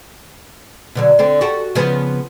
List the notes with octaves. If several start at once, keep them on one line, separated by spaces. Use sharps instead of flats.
B2 D3 F#3
D3 C4
F#4 G4 A4
C#3 F3 B3